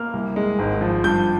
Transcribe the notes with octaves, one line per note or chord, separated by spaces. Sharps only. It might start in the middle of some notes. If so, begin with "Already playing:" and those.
Already playing: A#3 F6
C2
G#3
G#1
F3
G2 G6